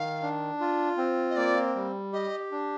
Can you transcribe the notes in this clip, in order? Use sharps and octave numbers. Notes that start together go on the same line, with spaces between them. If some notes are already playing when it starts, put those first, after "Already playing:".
Already playing: D#3 F5
D4
F4
C4
D#5
A#3 D5
G3
G4 D#5
D4